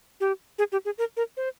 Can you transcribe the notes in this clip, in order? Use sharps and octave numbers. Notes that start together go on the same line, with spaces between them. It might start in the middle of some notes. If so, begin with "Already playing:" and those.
G4
G#4
G4
G#4
A#4
A#4
C5